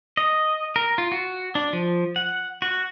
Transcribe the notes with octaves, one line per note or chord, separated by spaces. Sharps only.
D#5
A#4
F4
F#4
D4
F3
F#5
F#4